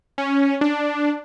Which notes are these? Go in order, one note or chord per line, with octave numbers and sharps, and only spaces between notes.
C#4
D4